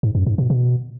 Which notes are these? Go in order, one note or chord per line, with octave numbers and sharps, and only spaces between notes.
G#2
F#2
G#2
B2
B2